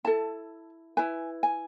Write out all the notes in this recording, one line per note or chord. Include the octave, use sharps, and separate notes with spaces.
E4 A4 A5
E4 B4 G#5
G#5